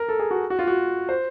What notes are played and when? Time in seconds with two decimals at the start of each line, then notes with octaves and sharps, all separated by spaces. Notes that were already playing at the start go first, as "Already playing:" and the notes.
Already playing: A#4
0.09 A4
0.20 G#4
0.31 F#4
0.50 F#4
0.59 F4
0.67 F#4
1.09 C5